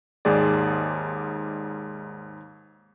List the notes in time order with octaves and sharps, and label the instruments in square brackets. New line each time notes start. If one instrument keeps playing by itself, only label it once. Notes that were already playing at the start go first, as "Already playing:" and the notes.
[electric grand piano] D#2 G#2 G#4 D5